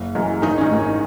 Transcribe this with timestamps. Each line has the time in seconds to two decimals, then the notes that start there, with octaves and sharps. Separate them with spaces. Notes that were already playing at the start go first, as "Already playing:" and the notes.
Already playing: F#1
0.15 F#2 E3 G#3
0.42 G#1 D#3 D#4
0.58 C#4
0.61 D#3 D#4
0.71 G#2 E3 G#3
0.79 C#4